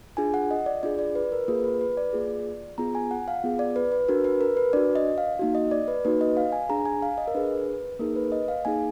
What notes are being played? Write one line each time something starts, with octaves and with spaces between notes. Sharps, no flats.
D4 F4 G#4 G#5
F#5
D#5
D5
D4 F4 G#4 D5
D5
B4
A#4
A#3 F4 G#4 B4
B4
B4
D5
A#3 F4 G#4
B3 F4 G#4 A#5
G#5
F#5
F5
B3 F4 G#4
D5
B4
B4
D4 F#4 A#4
B4
A#4
B4
D4 F#4 D5
D#5
F5
A#3 D#4 F#4
D#5
D5
B4
A#3 D#4 F#4 B4
D#5
F5
G#5
D4 G#4 A#5
G#5
F5
D#5
A#4
D4 G#4 B4
A#3 D#4 G#4 A#4
B4
D#5
F5
A#3 D#4 G#4 G#5